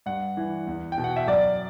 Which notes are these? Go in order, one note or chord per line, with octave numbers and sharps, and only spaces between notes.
G2 F#5
E3
E2
G5
B2
F#5
E5
F#2 D5